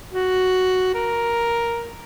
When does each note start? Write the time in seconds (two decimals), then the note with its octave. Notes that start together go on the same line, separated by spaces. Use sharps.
0.13 F#4
0.94 A#4